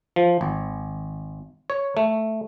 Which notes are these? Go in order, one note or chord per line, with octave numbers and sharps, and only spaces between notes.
F3
G#1
C#5
A3